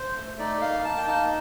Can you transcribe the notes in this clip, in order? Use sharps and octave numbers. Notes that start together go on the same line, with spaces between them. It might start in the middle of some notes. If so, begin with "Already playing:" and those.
Already playing: C5
A3
D#4 D5
A#3 F5
A#3 A5
G5
D#4 A5